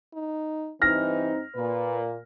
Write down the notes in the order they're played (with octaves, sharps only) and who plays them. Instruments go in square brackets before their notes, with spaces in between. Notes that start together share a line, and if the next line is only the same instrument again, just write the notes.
[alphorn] D#4
[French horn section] G2 C4 D#4 [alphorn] E3 [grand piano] F6 A#6
[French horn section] A#2 [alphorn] B4